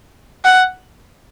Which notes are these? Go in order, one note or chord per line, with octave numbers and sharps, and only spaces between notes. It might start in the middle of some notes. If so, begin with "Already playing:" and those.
F#5